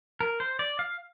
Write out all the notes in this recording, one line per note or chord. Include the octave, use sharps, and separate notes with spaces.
A#4
C5
D5
F5